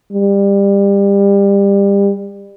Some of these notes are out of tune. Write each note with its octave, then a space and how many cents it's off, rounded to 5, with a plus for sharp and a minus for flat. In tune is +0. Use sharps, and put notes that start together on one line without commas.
G3 +25